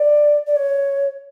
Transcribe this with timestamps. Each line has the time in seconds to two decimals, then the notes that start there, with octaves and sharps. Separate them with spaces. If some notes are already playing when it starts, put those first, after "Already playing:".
Already playing: D5
0.47 D5
0.56 C#5